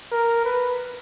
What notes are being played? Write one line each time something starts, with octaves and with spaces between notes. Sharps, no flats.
A#4
B4